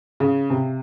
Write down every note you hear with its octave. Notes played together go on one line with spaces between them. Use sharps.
C#3
C3